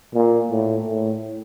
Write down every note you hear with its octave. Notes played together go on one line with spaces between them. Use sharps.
A#2
A2
A2